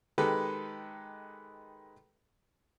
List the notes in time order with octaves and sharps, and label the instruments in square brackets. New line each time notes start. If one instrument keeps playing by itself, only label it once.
[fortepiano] D#3 G#3 G4 A4 B4